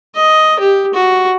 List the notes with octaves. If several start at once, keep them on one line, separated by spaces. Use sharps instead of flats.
D#5
G4
F#4